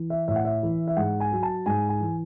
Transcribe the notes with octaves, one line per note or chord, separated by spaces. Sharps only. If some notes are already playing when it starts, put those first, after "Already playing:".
Already playing: E3
E5
A2 E5
F#5
E5
E3
E5
G#2 F#5
G#5
F#3
A5
G#2 G#5
G#5
E3